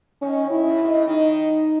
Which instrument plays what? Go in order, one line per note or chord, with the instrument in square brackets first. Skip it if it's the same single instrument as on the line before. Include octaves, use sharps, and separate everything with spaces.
[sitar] D#3 [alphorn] C#4
[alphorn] E4
[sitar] C#3
B2
C#3
[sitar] D#3 [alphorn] D#4